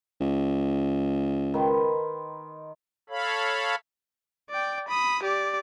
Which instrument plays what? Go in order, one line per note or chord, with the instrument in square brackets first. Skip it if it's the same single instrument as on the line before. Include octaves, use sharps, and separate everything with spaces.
[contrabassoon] C#2
[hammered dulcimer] D#3 B4 C6
[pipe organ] A4 C#5 F5 B5
[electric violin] D5 G5
B5 D#6
G4 D5